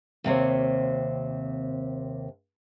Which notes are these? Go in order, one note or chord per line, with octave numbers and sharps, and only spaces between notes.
D#2 C3 C4 C#5